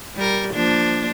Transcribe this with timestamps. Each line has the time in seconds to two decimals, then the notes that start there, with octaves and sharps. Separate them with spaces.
0.16 G3 A#4
0.53 F3 A#3 D4